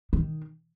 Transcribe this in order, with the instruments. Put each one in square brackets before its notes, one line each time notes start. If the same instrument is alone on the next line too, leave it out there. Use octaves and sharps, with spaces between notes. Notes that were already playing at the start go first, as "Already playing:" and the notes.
[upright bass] D#3